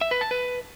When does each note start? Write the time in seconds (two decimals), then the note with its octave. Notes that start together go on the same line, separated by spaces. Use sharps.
0.01 E5
0.11 B4
0.21 A5
0.31 B4